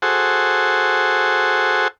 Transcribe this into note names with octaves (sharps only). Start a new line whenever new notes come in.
F#4 G#4 A4 C5